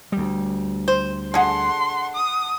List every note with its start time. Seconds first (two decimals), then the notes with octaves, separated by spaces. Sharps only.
0.12 D2 G3
0.88 C5
1.34 D3 G#4 F#5 A5 C6
2.15 D#6